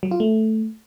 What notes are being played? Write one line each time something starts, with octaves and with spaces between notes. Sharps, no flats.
F#3
F4
A3